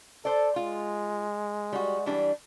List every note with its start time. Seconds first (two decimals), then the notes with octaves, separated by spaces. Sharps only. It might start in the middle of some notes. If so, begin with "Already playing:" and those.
0.25 A4 C5 D5
0.56 G#3 F4
1.73 G3 F#4
2.06 E3 G3 D4